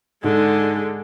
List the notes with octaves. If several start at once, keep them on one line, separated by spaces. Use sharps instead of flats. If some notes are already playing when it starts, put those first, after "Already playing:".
G#2 D3 G#3